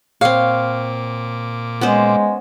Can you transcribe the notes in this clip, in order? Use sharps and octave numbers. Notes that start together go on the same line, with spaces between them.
A#2 C4 C#5 F5 D6
G#3 B3 C#4 C5